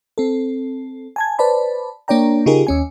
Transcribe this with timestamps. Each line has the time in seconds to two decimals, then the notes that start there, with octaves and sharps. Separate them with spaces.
0.18 C4 A4
1.16 G#5 A5 G#6
1.39 B4 C5 D5 A5 B5
2.08 A#3 D4 C#5 D5 G5 A#5
2.46 C#3 D#4 F4 G4 G#4 A#4
2.67 D#2 C#4 G#5